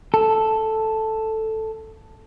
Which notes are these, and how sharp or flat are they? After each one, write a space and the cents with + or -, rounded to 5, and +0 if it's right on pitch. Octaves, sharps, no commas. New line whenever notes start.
A4 +0